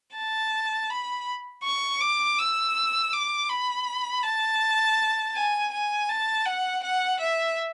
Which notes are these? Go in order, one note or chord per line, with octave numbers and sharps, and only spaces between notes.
A5
B5
C#6
D6
E6
D6
B5
A5
G#5
G#5
A5
F#5
F#5
E5